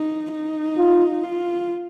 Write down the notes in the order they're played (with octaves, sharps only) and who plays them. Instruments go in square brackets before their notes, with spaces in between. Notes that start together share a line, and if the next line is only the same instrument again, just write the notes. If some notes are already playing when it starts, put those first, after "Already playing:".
Already playing: [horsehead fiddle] D#4
D#4
[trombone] F4
[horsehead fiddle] F4